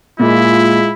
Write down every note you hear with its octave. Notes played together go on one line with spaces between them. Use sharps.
A#2 G#3 E4 F4 B5